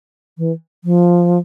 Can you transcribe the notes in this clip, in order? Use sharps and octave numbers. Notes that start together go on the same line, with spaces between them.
E3
F3